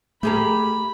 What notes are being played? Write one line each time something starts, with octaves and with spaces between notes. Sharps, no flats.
A3 G4 G#4 A#4 B5